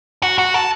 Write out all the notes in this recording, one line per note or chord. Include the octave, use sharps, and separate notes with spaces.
F#4
F#4
A4